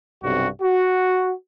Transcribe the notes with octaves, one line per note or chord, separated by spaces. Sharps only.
B1 G2 C3 F#4
F#4